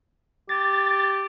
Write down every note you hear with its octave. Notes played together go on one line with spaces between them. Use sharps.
G4 A6